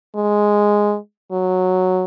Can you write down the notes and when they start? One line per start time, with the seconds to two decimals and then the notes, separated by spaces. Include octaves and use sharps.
0.15 G#3
1.32 F#3